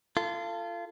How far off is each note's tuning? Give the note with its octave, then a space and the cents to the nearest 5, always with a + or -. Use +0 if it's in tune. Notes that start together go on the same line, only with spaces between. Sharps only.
F4 -25 A4 +15